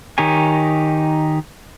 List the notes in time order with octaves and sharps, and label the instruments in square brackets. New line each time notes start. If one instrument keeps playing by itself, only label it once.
[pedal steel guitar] D#3 D#4 G4 C#5 G#5